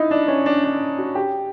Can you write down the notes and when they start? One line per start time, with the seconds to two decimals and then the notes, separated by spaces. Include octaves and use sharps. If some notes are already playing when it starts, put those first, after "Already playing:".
Already playing: D#4 E4
0.11 D4
0.28 C#4
0.46 D4
0.64 D4
0.98 F#4
1.15 G4